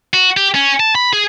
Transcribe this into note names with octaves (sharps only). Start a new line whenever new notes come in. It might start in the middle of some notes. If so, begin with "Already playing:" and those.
F#4
G4
C#4
A5
B5
G#4